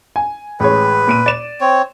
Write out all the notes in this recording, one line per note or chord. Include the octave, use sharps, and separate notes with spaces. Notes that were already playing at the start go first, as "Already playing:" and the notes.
G#5
A1 G#3 B4 C#5
A#2 D7 D#7
D5 E7
C4 C#5